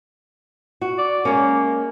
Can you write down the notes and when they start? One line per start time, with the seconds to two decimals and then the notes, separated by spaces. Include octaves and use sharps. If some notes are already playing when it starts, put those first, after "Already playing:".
0.81 F#4
0.98 D5
1.25 G#3 A#3 C#4